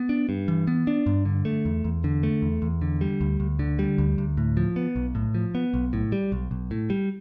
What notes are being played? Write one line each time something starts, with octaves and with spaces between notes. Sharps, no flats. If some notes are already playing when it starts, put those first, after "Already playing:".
Already playing: B3
D4
G2
E3
B3
D4
G2
D3
A3
E2
E2
D3
A3
E2
E2
D3
G3
D2
D2
D3
G3
D2
D2
A2
F3
B3
B1
A2
F3
B3
B1
A2
G3
B1
B1
A2
G3